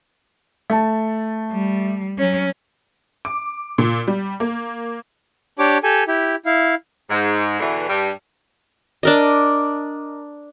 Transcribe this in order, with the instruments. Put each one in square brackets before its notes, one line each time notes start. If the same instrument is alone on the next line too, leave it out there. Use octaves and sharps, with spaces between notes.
[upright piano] A3 A5
[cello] G3
F#3 C#4
[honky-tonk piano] D6
A#2
G3
A#3
[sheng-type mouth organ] D4 G4 C#5 D6
G4 A4 G#5
E4 G4
E4 F5
[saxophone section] G#2
E2 B2 D3 E3
G2 G3
[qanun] D4 A#4 D#5